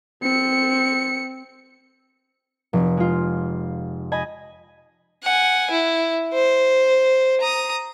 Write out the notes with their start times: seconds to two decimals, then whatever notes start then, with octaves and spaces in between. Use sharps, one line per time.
0.22 C4 C#7
2.73 F1
2.97 G#3 F4
4.12 D#5 G#5 B5
5.23 F#5 G#5
5.71 E4
6.34 C5
7.41 A#5 D#6